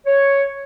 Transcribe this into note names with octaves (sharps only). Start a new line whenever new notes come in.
C#5